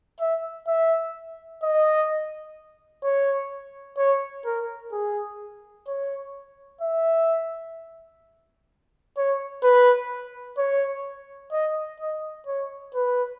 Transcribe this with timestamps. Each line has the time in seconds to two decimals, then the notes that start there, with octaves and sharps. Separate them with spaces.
0.20 E5
0.68 E5
1.63 D#5
3.04 C#5
3.98 C#5
4.45 A#4
4.93 G#4
5.87 C#5
6.81 E5
9.17 C#5
9.63 B4
10.58 C#5
11.52 D#5
12.00 D#5
12.47 C#5
12.95 B4